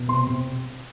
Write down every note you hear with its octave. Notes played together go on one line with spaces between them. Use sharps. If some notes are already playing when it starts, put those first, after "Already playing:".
Already playing: B2
C3 C6
C3